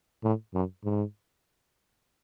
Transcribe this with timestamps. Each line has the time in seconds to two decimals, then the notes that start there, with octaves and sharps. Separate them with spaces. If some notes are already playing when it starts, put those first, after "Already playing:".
0.23 A2
0.54 F#2
0.84 G#2